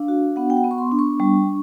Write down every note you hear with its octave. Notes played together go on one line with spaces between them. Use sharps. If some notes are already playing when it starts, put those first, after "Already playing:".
Already playing: D4 F5
F#4
B3 F#5
G5
F#5
B3
C#6
C6
D4
C#6
G3